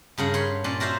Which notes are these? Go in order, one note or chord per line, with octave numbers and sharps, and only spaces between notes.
G2 C#3 A#4 F#5
C#5 B5 C6
A#2 C#4 D5 C6
F#4 A#4 C5 E5 F5